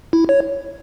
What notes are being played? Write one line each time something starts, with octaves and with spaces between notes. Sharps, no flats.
E4
C#5